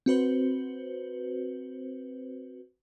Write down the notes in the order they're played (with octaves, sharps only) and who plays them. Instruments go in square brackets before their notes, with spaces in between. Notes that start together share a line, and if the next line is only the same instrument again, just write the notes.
[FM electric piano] C4 F#4 B4 C5